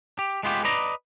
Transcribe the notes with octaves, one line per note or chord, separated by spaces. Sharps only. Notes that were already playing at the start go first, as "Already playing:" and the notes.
G4
G#3 B3 F4 G4
B4 D5 D#5 A#5